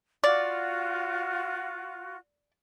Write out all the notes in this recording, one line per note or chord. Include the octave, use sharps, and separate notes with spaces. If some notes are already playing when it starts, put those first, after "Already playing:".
F4 F#4 D5